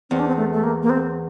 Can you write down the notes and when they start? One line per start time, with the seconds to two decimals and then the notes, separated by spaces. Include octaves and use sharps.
0.10 E2 C4
0.19 D4
0.28 C4
0.37 A3
0.53 A3
0.64 A#3
0.83 A#3
0.90 C4